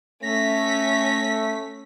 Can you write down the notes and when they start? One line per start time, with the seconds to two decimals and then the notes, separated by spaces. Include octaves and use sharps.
0.23 A3 C#4 A#6 B6